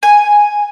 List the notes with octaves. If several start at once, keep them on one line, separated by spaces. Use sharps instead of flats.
G#5